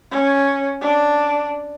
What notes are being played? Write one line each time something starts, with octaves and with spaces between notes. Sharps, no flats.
C#4
D4